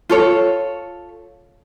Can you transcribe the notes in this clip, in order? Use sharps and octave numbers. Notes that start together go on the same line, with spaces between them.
F4 A4 C#5